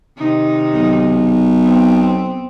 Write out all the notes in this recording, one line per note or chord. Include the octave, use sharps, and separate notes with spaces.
C3 D#3 D#4
B1
B3 C4